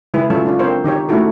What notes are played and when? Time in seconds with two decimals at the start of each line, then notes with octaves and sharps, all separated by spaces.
0.14 C#3 G#3 E4 G#4 B4
0.30 F#3 G#3 C#4 F4 A4
0.45 C#4 D4 F4
0.59 C4 D4 A#4 C5 C#5
0.84 D#3 D#4 G4 C#5
1.09 A3 C#4 D#4 E4 F#4 A4